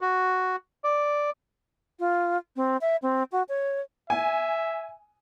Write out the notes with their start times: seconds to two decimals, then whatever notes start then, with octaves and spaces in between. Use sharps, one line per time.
0.01 F#4
0.84 D5
1.99 F4
2.56 C4
2.81 E5
3.02 C4
3.32 F#4
3.49 C#5
4.10 E5 G#5